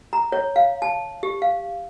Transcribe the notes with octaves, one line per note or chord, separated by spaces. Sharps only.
A#5
C#5
F5
A5
G4
F5